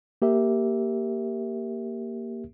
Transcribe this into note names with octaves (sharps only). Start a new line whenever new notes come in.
A#3 G4 A#4 E5